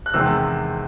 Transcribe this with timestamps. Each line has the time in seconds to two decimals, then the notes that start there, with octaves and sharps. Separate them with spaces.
0.06 F#6
0.14 E2 C3 D#3 G#3 C4 E6